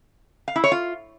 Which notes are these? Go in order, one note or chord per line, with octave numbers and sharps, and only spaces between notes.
F5
E4
C#5
F4